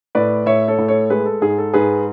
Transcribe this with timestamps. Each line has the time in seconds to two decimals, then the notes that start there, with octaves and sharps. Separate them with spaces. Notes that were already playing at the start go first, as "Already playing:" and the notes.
0.15 A2 B4 D5
0.46 A2 C#5 E5
0.68 A4 C#5
0.78 A2
0.88 A4 C#5
1.10 G#3 G#4 B4
1.26 A4
1.42 G#2 G#4
1.58 A4
1.74 G#2 G#4 B4